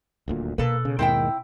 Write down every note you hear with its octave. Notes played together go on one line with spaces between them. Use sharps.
D#1 D2 A#2
B2 A#3 A4 B4
C#3
D#2 G#2 D#3 C4 E4 G5